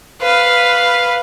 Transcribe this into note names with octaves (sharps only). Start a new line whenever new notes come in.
B4 F5